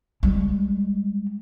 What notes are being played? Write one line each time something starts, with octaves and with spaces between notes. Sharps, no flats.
G3 G#3